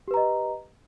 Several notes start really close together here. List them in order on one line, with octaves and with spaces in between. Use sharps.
G4 B4 A#5 D#5